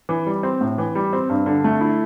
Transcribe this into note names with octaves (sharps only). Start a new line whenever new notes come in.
E3
G3
C4
A2
E3
G3
C4
G2
D3
A3
E4